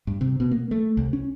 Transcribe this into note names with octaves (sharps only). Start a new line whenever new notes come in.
G2
C3
B2
A#3
A3
C2
C#4